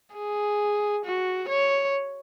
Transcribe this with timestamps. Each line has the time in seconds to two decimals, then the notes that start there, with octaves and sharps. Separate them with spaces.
0.15 G#4
1.05 F#4
1.49 C#5